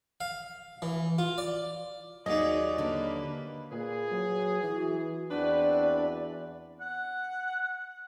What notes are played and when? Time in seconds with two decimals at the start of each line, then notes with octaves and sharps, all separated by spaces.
0.21 F5
0.82 E3
1.18 F4
1.38 D5
2.26 D#2 F#3 D#4 F#4 G#4 D5 D#5
2.78 D3 A#3 B4 D5
3.71 A#2 G#4 B4
4.12 F#3
4.64 E3 F#4
5.31 E2 C4 D4 F#4 B4 D5
6.81 F#5